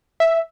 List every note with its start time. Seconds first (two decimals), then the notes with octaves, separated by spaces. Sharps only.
0.20 E5